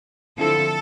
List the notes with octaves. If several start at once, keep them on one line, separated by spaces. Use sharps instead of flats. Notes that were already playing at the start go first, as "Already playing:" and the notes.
D3 F3 C4 E4 A4